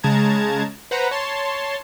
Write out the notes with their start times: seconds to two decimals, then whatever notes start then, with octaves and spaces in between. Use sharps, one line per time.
0.03 C#3 G#3 A5 A#5 G#6
0.91 B4 C5 F#5 A#5 B5
1.11 C#5 A5 C6